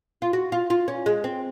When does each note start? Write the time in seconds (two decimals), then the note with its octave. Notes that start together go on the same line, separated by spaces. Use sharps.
0.22 F4
0.33 F#4
0.52 F4
0.70 F4
0.88 C#4
1.06 G#3
1.24 C4